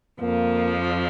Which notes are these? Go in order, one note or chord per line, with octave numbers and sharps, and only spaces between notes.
F2 F3 A#3